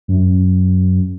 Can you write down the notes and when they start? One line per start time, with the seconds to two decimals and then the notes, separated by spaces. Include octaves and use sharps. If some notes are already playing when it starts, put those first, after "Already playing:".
0.08 F#2